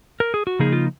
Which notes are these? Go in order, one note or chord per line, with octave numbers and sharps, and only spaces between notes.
A#4
G#4
F#4
C#3 F3 A#3 D#4 G#4
F4